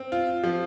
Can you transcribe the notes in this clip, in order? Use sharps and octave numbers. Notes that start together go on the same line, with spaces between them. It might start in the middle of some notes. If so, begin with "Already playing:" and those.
Already playing: C4
F4
F3